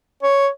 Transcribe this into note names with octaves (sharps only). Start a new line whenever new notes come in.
C#5